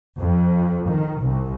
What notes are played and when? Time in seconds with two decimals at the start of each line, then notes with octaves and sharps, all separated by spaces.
0.20 F2
0.89 D#3
1.21 C2